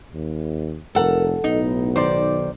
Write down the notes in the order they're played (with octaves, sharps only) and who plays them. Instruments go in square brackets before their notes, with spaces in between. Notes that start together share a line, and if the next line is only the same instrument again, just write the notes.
[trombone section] D#2
[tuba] F1 [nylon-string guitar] A4 F#5 [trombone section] A#4
[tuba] B1 [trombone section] A2 B3 [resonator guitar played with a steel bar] D#4
[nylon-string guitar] D#3 [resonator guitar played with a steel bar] C5 D5